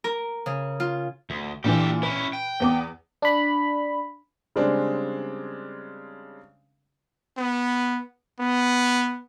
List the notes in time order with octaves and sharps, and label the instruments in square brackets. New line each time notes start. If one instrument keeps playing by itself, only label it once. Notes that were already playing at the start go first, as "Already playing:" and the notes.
[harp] A#4
C#3
F4
[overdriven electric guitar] D2
[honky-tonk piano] A#2 D3 E3 [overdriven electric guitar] G4 A4
[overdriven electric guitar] C#4 E4 [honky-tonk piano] B4
[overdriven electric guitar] G5
[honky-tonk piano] E2 B3 D6
[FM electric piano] D4 B5
[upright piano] C#3 G3 G#3 C4 D4
[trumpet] B3
B3